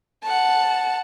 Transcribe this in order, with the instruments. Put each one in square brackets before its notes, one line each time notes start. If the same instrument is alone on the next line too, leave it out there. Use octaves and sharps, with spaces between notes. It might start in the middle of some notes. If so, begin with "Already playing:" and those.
[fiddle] F#5 A5